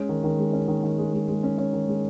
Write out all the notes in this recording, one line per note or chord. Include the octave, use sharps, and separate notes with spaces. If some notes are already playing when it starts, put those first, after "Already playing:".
Already playing: G#3 C#4
D#3
D#3
G#3
C#4
D#3
D#3
G#3
G#3
G#3
C#4
C#4
D#3
G#3